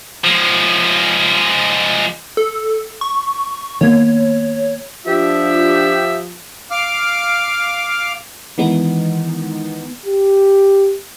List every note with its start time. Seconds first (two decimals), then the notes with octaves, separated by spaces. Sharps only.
0.24 F3 G#3
2.37 A4
3.01 C#6
3.81 D#3 A#3 B3 C#5
5.06 F3 D4 F4 G4 E5
6.71 F5 D6 F6
8.58 D#3 E3 G#3 B3 D#4
10.06 G4